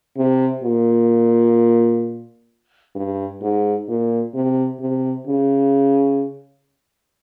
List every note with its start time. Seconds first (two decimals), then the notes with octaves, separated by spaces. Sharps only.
0.17 C3
0.63 A#2
2.95 G2
3.42 G#2
3.88 A#2
4.34 C3
4.80 C3
5.27 C#3